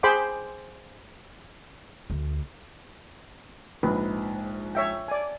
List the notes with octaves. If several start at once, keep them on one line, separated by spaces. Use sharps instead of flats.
G#4 C5 G5 B5 C6 D6
D2
A#1 G#2 B4
C#5 E5 G5
D5 G#5